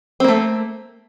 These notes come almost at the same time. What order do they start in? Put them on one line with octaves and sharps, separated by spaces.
C4 A#3 A3